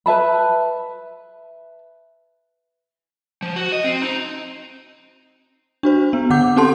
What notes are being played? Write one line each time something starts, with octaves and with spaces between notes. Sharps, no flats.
B4 E5 A5 B5
F3
F#4
D#5
C4
D#4
D4 F#4 C5
B3
D3 F#5 D6 G6
C4 C#4 G4 A4 A5 C6